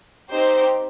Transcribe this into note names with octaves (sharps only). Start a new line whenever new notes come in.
C4 D#4 G4 C5